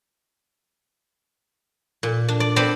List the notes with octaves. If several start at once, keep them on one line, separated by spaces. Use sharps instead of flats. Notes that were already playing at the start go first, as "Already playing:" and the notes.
A#2
D4
D5
B3 C4 C5 D5 A5 B5